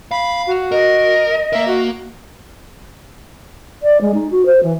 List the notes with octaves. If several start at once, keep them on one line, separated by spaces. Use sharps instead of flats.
F5 B5
F#4
A#4 D#5
A#3 A#4 E5
F#4
D5
G#3
D#4
F#4
C5
E3